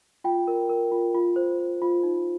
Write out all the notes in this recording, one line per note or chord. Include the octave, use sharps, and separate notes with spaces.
F4 G5
A#4
A#4
F4
F4
C5
C5
F4
D#4